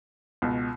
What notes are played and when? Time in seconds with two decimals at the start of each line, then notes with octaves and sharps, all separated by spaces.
0.42 C#2 B2